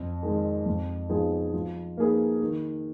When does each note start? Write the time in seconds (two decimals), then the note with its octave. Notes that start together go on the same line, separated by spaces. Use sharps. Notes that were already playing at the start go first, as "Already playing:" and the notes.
Already playing: F2
0.23 D#3 G#3
0.66 F2
1.09 F3 B3 D#4 G#4
1.53 F3
1.97 A#3 D#4 G#4 B4
2.41 D#3